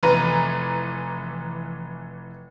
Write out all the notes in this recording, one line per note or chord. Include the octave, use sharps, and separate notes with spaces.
F1 E3 B4 A#5